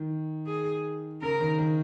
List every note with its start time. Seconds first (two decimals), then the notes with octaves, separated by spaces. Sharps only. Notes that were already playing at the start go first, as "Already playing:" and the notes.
Already playing: D#3
0.46 G#4
1.22 C#3 A#4
1.41 D#3
1.59 D#3